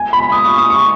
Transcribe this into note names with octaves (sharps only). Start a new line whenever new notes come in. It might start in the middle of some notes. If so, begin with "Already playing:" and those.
Already playing: G#5
B5
D#6
C#6
D#6
C#6